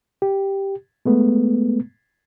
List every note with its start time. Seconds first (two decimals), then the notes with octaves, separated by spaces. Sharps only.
0.22 G4
1.05 G#3 A3 B3